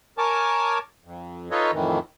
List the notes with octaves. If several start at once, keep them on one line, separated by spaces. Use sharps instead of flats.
A#4 C#5 G#5 A5 D6
F2
D#4 F4 A4 B4 C#5 D#5
F2 A2 D#3 E3